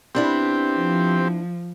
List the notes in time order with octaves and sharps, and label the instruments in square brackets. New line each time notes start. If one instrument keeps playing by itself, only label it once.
[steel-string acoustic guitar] B3 D4 E4 [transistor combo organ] C4 G4
[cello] F3